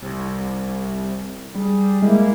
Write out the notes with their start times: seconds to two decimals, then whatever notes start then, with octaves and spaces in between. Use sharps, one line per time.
0.02 C2
1.55 G3 G#4
2.02 G#3 A#3 E4